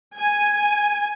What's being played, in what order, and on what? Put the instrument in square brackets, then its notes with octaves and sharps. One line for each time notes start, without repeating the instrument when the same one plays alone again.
[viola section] G#5